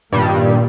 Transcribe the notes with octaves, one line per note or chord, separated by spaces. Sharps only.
G2 A#2 D#3 G3